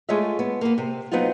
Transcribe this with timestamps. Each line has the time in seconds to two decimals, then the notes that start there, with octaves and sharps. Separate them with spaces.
0.09 G#3 A3 F4 C#5 D#5 E5
0.39 B3
0.61 A#3 B3
0.78 C3
1.12 F#3 B3 C4 D#4 F4